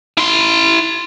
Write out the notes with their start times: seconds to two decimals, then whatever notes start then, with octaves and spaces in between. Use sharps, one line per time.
0.18 E4 C6